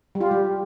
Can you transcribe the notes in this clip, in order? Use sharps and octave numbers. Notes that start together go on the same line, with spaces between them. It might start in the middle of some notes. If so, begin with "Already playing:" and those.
G3
F4
G4
G3